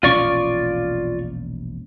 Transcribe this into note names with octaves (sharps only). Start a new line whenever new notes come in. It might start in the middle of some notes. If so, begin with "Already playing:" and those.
E1 A#1 C#4 F4 D5 C#6